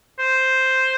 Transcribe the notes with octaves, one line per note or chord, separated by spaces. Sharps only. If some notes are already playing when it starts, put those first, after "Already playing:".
C5